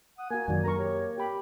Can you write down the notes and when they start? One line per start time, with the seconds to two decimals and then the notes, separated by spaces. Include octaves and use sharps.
0.18 F#5 D#6
0.31 A#3 F#4 A#4 G#5
0.48 F#2 D#3 F#3 D5
0.64 D4 A#4 A#5 C#6
0.78 G4 C#5
1.18 G4 G5 B5